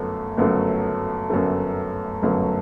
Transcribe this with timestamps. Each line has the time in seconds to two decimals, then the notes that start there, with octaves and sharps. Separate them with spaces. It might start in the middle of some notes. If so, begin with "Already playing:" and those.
Already playing: G1 F#2 F#3 A3
0.37 G1 F#2 F#3 A3
1.30 G1 F#2 F#3 A3
2.22 G1 F#2 F#3 A3